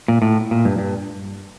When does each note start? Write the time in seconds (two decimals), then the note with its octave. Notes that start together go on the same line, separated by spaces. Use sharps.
0.08 A#2
0.22 A2
0.51 A#2
0.65 G2
0.78 G2